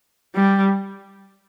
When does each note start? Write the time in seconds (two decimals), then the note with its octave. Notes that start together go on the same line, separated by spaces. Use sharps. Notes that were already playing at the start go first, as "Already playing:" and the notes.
0.35 G3